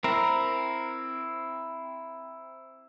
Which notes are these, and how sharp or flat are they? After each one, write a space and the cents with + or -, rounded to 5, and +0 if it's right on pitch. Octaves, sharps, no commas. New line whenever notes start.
C4 +0 E4 +5 A#4 +0